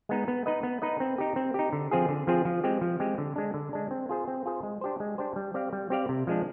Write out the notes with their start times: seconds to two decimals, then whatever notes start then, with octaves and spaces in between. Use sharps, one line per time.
0.09 G#3 B3 D#4
0.28 B3
0.46 D#4 B4 D#5
0.63 B3
0.82 D#4 B4 D#5
1.00 C4
1.18 D#4 G4
1.36 C4
1.54 D#4 G4
1.73 D3
1.91 F3 C4 F4 G#4
2.08 D3
2.27 F3 C4 F4 G#4
2.45 F3
2.64 G#3 C4 G4
2.81 F3
3.00 G#3 C4 G4
3.18 D3
3.36 G#3 D4
3.54 D3
3.73 G#3 D4
3.91 C4
4.09 F4 G#4 C5
4.28 C4
4.45 F4 G#4 C5
4.63 G#3
4.81 D4 G4 C5
5.00 G#3
5.18 D4 G4 C5
5.36 G3
5.54 C4 G4 D5 F5
5.73 G3
5.90 C4 G4 D5 F5
6.09 C3
6.27 F3 G#3 D4